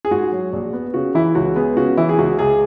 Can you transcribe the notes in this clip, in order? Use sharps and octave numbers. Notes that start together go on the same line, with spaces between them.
G#4
G#2 F#4
F#3
A#1
B3
C#3 F#4
E3 E4
C#2 F#4
B3 G#4
C#3 F#4
E3 E4
G#4
C#2 F#4
C#2 G#4